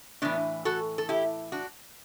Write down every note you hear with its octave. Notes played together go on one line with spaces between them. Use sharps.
A2 E3 B3 D4
F#4 A4
A4
E4 G4
D4 F#4